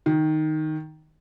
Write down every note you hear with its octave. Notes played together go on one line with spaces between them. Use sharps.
D#3